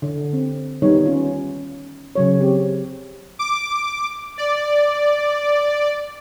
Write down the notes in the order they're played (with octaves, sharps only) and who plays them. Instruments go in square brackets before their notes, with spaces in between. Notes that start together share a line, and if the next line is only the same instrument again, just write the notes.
[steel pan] D3
C4
D#3 G3 B3 D#4 A#4 C#5
C#4 F4
C#3 F#3 C#5
C4 G4
[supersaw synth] D6
D5